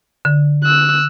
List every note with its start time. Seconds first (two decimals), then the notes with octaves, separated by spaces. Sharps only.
0.25 D3
0.64 E6 F#6